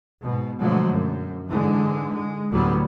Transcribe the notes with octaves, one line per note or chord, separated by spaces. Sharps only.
G#2 B2
B2 D3 F3 F#3 G#3 A3
F#2
G#2 D3 E3 G#3
G#3
D2 A2 D3 F#3 G3 B3